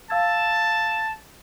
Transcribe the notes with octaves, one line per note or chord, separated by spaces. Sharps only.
F5 A5 E6 G#6